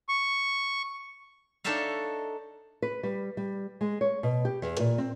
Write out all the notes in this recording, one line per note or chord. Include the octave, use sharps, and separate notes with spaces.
C#6
D4 D#4 A4 C#5 E5 F5
B4
G3
G3
G#3
C#5
B2
G4
E2
A#2
C4